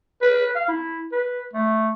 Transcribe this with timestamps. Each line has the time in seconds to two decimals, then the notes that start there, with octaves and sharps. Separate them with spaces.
0.22 B4
0.55 F5
0.68 E4
1.12 B4
1.53 A3